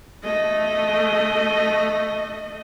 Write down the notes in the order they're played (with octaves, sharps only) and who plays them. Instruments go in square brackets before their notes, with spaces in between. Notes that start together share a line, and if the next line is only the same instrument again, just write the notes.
[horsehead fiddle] A3 D#5